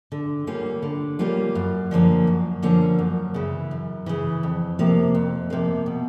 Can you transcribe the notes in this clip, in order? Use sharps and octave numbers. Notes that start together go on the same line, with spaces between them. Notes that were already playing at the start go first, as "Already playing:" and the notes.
D3
G3 A#3 C#4 F4
D3
G3 A#3 C#4 F4
F#2
D3 F3 A#3 C#4
F#2
D3 F3 A#3 C#4
F#2
C#3 E3
F#2
C#3 E3
F2
C3 F3 A#3
F2
C3 F3 A#3
B2